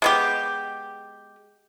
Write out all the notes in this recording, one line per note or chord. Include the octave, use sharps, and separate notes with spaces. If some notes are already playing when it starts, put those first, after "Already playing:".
G#3 B3 G4